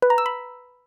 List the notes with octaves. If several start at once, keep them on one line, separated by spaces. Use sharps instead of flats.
B4
A#5
E6
B5